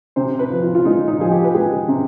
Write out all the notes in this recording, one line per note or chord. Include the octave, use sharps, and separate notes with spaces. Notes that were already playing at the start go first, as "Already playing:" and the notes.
C3 C5
B4
F3
F4
F4
G#3 D#4
D#4
F3 G#4
G4
B4
G#3 G#4
C3